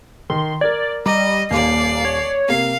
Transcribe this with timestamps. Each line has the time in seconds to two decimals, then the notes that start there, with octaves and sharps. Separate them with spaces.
0.30 D#3 C6
0.61 A#4 D5 G#6
1.06 G3 D#5 A#5 D6
1.51 D#1 D#2 A#3 D5 C7
2.05 C#5
2.48 C3 A#3 F5 C7